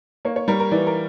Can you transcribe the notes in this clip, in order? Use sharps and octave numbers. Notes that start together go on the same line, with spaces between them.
A#3 C#5
C#5
G3 A#4
A#4
E3 D5
A#4